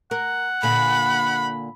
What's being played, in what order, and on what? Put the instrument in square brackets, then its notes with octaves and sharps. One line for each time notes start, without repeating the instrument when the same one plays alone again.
[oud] A#4 [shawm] F#5
[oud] A#2 D3 [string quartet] B5